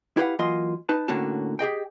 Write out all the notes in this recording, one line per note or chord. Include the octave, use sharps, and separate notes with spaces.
E4 G4 B4 C5 F5 F#5
E3 F#3 A#3 F4 D#5 C6
D#4 B4 A5
A2 D3 A#3 C#4 F#4 A5
G4 G#4 D#5 G5